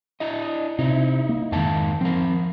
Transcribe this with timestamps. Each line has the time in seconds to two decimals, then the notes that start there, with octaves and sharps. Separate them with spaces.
0.20 D4 E4 D#5
0.79 C3 D#4 E4
1.29 A#3
1.52 F2 G#2 D#3 A#3 A5
2.01 F3 C4 A#4